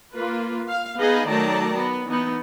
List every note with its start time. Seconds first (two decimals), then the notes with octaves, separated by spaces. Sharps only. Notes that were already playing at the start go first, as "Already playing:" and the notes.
0.13 A#3 F4 B4
0.68 F5
0.98 B3 D#4 G#4 B4 D#5 F5
1.28 D#3 F#3 A3 D5 A5 A#5
1.77 B3
2.06 E3 B3 D#4